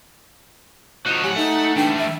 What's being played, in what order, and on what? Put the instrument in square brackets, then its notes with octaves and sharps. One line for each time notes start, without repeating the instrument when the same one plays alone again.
[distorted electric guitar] D3 D#4 [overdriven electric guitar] F3 F#4 [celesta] F#6 E7 F7
[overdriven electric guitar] A2 F#3 [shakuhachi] G4 [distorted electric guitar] F#5 [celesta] G#5
[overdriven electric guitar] A3 [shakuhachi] D#4
[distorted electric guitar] E3 G3 [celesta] D4 [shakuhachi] G5
[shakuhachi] E5